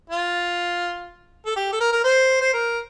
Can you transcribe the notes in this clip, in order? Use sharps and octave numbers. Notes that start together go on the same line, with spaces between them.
F4
A4
G4
A4
A#4
A#4
C5
C5
A#4